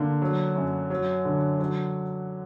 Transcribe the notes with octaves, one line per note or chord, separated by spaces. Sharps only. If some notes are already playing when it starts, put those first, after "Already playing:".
Already playing: D3 A#3
F#3
F#2
F#3
D3
F#3